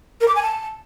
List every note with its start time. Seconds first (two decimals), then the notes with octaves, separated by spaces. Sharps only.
0.21 A#4
0.28 D6
0.35 G#5
0.42 A5